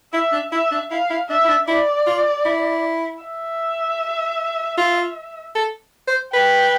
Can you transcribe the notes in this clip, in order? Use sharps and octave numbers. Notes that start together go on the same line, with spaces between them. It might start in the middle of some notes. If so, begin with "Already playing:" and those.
E4 E5
D4
E4 E5
D4
E4 F5
E4
D4 E5
E4
D4
E4 D5
F4
E4
E5
F4
A4
C5
B4 G5